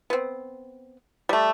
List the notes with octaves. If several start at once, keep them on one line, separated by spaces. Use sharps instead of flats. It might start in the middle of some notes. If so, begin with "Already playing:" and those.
B3 C4
G3 A3